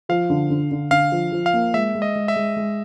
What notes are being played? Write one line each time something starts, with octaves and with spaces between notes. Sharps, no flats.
F3 F5
D3
D3
D3
D3 F5
F3
F3
F5
A#3
G#3 E5
G#3
D#5
G#3
E5
G#3
G#3